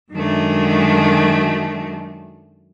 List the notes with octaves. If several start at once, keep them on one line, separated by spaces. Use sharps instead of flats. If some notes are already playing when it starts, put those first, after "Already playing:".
F#2 D#3 F#3 G#3 A3 D4